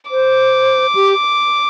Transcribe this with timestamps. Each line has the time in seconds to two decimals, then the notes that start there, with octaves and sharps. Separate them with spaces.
0.11 C5 D6
0.95 G4